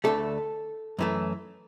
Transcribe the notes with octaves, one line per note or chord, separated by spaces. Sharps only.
D2 D3 A3 A4
F#2 E3 A3